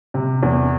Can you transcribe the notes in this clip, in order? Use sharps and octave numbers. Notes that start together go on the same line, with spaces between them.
C3
E2